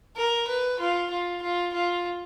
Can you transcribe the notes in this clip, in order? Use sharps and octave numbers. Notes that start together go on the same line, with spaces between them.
A#4
B4
F4
F4
F4
F4